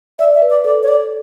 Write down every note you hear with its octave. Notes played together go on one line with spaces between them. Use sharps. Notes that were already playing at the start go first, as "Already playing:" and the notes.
D5 E5
E5
B4
D5
A4 D5
C#5
D5